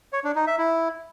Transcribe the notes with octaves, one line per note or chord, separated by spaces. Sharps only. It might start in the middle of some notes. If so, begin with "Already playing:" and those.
C#5
D4
D#4
E5
E4